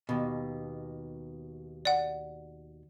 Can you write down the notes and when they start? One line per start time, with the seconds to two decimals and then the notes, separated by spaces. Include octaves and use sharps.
0.09 D#2 B2
1.85 D5 F#5